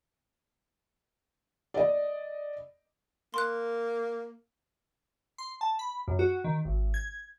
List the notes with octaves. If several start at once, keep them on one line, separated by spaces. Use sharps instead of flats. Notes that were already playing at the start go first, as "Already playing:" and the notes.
D5 D#5
A#3 C6 F#6
C6
A5
B5
F#2
F#4
D#3
G#1
G#6